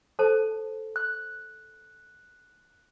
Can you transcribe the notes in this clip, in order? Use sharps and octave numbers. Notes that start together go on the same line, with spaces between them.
A4 C5 A5
F#6